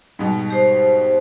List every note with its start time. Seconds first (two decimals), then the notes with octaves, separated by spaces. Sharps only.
0.19 G#2 B2 G3
0.50 G4 C5